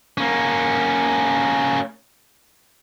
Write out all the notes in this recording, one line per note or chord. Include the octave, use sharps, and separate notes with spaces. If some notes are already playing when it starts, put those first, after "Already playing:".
A#3 C#4